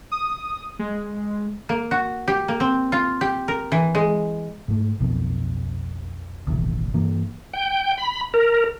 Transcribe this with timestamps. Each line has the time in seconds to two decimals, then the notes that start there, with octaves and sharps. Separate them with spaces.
0.12 D#6
0.79 G#3
1.69 A#3
1.91 F#4
2.28 G4
2.48 A#3
2.60 C4
2.92 F4
3.21 G4
3.48 A#4
3.72 E3
3.95 G#3
4.68 G#2 A3
5.00 B1 F2 B2
6.47 E1 A1 D#2
6.94 G2 E3 A#3
7.53 G5
7.98 B5
8.34 A#4